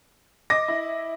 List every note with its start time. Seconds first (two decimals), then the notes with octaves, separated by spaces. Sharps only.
0.50 D#5 D6 A#6
0.68 E4